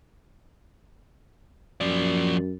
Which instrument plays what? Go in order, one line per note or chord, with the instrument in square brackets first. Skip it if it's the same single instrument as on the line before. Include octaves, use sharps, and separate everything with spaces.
[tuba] F#2 [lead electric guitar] F3 D5